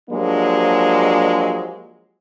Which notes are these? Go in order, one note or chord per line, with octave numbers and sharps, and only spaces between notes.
F3 F#3 G#3 A#3 D4 G4